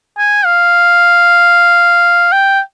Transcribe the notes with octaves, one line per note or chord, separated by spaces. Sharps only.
G#5
F5
G5